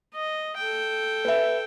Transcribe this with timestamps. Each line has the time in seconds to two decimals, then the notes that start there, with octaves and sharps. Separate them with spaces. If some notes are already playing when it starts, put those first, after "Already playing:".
0.14 D#5
0.57 A4 G5
1.25 B4 E5